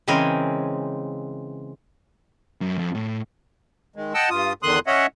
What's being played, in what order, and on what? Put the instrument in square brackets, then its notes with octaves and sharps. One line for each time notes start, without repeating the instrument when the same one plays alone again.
[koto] C#3 E3 G#3 C4 A#4 G#5
[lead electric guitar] F#2
F2
A2
[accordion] D#3 G#3
D#5 F#5 G5 A5 E6
G2 F4 D#6
E2 D3 D#3 C6 D#6 F#6
C#4 C#5 D#5 E5 F#5